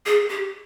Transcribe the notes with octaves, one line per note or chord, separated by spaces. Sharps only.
G#4
G4